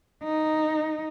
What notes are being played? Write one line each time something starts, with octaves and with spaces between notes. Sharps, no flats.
D#4